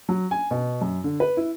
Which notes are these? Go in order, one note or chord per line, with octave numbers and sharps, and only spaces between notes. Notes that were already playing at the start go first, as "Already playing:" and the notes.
F#3
G#5
B2
F#2
D3
B4
E4